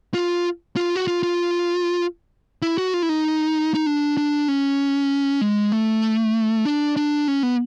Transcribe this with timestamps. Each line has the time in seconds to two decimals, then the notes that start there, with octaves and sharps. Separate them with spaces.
0.14 F4
0.76 F4
0.96 F#4
1.07 F4
1.23 F4
2.62 E4
2.78 F#4
2.94 F4
3.03 E4
3.09 D#4
3.74 D#4
3.86 D4
4.17 D4
4.48 C#4
5.41 G#3
5.72 A3
6.65 D4
6.97 D4
7.28 C#4
7.43 B3